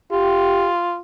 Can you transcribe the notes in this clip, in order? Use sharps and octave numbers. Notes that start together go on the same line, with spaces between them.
F4 G4